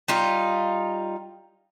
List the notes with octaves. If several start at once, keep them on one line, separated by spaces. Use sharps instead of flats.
G3 D#4 F4